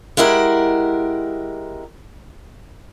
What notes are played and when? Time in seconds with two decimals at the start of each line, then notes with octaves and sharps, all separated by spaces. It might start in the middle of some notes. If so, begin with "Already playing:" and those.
0.17 G#3 E4 G4 A#4 F#5